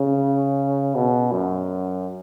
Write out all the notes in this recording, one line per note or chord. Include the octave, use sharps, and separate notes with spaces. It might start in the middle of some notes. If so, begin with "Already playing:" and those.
Already playing: C#3
B2
F#2